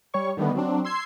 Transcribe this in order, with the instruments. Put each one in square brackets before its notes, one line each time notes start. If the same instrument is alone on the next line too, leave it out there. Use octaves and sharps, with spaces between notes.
[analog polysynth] G3 C#5 C#6
D3 D#3 G3 A3 B3
F#3 C4 D4
C6 E6 G#6 C7